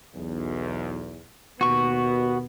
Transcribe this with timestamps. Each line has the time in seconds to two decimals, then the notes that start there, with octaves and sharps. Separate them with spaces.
0.15 B1 E2
1.61 D#2 B2 B3 F#4 C#6